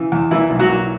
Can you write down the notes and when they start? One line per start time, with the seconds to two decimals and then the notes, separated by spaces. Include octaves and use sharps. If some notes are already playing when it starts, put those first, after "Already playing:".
Already playing: C#3 E3
0.12 E2
0.31 A#2 E3 E4
0.50 B1
0.59 F#3 F#4
0.69 A#2